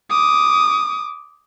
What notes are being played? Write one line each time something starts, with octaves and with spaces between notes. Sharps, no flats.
D6 D#6